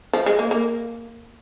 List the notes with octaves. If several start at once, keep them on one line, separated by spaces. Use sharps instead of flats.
F3
G#3
A#3
A#3